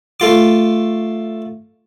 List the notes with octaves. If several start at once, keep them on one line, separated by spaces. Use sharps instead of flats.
A3 F4 D6